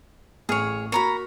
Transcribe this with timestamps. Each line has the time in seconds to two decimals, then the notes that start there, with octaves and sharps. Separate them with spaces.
0.49 A1 G#4 C#5 F6
0.92 A#3 F#4 C#5 A#5 B5